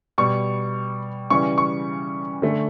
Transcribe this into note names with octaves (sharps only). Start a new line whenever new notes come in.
B2 G3 C#6
C#3 E3 G3 C#6
C#6
D3 A3